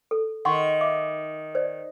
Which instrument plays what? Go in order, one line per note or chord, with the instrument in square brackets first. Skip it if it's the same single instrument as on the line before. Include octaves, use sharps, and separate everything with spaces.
[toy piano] A4
[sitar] D#3 [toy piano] F#5 C6 C#6
[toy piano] E5 D6
C5 D5